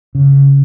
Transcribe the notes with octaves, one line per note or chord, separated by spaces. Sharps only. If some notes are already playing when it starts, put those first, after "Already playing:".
C#3